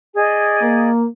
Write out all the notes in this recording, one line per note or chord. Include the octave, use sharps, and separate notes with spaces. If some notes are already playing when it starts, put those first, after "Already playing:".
G#4 D5 D#5
A#3